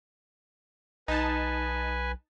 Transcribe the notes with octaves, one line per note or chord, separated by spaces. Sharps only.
B1 D#4 B4 G#5 A5